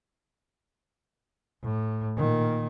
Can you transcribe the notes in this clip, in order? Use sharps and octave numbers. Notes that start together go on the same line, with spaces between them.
A2
A#2 D#3